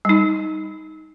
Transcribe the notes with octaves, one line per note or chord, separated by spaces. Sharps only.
G3 D#4